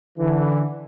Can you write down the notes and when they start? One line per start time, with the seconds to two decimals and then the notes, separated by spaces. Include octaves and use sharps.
0.19 D3 E3